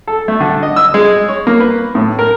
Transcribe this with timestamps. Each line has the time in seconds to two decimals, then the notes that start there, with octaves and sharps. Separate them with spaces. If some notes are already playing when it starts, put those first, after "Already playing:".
0.07 A4
0.28 A3
0.40 D3
0.63 D#5
0.76 E6
0.94 G#3
1.28 C#5
1.47 A#3
1.60 B4
1.95 A2
2.19 A#4